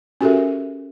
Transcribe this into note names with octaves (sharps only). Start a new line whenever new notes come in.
C#4 F#4 G4 A4 A#4 E5